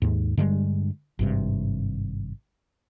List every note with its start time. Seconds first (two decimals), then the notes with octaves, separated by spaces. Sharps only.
0.02 D#2 G#2
0.37 G2 D3 G3 G#3
1.19 G#1 G2 C3